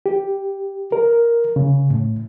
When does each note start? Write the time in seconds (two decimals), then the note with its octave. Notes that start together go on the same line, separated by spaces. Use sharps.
0.06 G4
0.92 A#4
1.56 C#3
1.90 A2